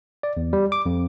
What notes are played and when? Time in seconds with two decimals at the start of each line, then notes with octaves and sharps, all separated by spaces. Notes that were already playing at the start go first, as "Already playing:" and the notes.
0.23 D5
0.37 E2
0.53 G3
0.72 D6
0.86 F2